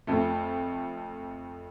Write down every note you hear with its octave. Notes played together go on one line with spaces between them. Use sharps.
F2 F3 A3